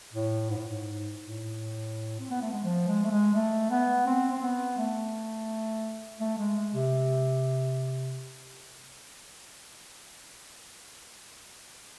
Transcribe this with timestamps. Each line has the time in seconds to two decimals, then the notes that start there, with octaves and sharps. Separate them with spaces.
0.13 A2
0.50 G#2
0.58 A2
0.69 G#2
1.20 A2
2.20 C4
2.30 B3
2.42 A3
2.52 G#3
2.64 F3
2.87 G#3
3.04 A3
3.11 G#3
3.34 A3
3.70 B3
4.06 C4
4.32 C4
4.42 B3
4.77 A3
6.20 A3
6.38 G#3
6.56 G#3
6.74 C3